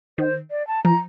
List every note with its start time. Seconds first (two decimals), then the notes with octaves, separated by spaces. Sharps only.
0.18 D#3 C5
0.51 D5
0.67 A5
0.84 F3 A#5